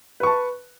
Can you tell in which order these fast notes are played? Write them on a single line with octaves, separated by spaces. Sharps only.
B4 C#6 A5